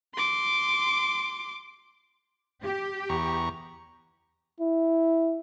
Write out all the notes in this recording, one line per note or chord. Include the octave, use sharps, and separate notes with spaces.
C6 D6
G4
E2 A#5 C#6
E4